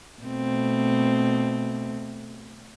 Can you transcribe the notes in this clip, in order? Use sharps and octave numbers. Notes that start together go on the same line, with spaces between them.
B2 A3 C4